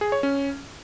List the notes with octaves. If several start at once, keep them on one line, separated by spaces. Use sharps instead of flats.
G#4
C#5
C#4